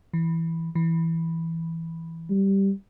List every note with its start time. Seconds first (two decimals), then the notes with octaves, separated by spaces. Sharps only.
0.13 E3
0.75 E3
2.30 G3